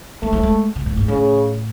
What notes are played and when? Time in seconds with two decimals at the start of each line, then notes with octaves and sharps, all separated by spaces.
0.22 G#3 A3
0.33 F#3
0.43 G#3
0.76 C#3
0.86 A2
0.97 G#2
1.08 A2 C#3